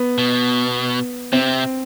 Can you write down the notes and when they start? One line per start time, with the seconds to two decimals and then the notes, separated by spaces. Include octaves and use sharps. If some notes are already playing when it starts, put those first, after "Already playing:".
Already playing: B3
0.18 B2
1.33 C3 C4